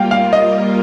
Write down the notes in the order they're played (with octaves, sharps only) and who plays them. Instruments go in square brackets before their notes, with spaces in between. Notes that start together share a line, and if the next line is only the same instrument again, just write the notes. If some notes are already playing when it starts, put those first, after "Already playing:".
Already playing: [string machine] G3 A#3 F4 [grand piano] F5 G5
[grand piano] F5
[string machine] G3 A#3 F4 A#4 [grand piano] D#5